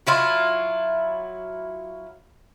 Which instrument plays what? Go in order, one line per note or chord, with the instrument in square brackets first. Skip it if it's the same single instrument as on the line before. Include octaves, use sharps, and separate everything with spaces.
[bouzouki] F#3 E4 F4